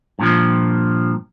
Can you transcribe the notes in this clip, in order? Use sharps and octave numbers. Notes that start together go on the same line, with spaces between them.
G2 A#2 F3